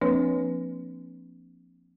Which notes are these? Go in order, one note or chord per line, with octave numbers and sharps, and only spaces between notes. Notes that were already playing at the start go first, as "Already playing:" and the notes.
F3 A#3 C4 D4 B4 C#5